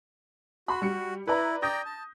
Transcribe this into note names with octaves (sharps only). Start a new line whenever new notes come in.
F#4 B5 C6
G3 C#7
E4 B4 D5 A#5
D5 G5 A#5 D#6 G6 A#6
A5